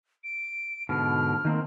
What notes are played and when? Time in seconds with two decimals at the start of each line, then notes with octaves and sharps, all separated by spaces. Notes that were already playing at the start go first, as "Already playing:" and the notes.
0.24 D7
0.89 G#2 B2 D3 F6
1.45 D#3 A#3 C4